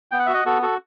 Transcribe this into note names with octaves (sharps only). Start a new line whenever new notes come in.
B3 G5
F#5
F#4 E5
D#5 F#5
B3 F#4 A4
F#4 A4